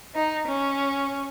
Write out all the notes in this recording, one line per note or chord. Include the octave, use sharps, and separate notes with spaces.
D#4
C#4